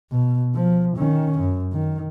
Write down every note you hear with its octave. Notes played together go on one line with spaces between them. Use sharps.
B2
F3
D#3 C#4
F#2
D#3